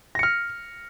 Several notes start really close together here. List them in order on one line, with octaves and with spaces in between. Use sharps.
A#6 C#7 F6